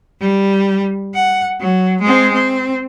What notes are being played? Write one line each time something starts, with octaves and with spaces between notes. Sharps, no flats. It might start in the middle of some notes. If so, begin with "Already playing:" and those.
G3
F#5
F#3
G#3 C4
C4